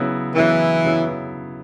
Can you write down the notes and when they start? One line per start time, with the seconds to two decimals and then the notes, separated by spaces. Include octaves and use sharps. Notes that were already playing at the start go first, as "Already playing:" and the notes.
Already playing: C#3 F#3 B3 E4
0.35 C#3 E3 F#3 B3 E4
0.85 C#3 F#3 B3 E4